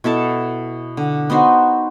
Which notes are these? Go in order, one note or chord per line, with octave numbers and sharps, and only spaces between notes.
B2 E4 A4 A5
D3
B3 D#4 F#4 C5